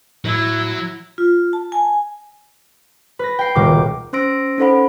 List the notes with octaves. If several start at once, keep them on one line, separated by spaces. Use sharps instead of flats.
A2 F#3 E4
F4
A5
G#5
B4 A#6
G5 C7
D#1 C#2 B2 D#3 D6
C#4 C5 C6 E6 A#6 D7
C#4 D#4 A4 C5 F#5 B5